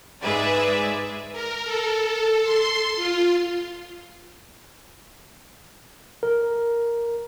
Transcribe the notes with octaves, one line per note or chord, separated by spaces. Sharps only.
G#2 G#3 G#4 B4 D5 E5
A#4
A4
C6
F4
A#4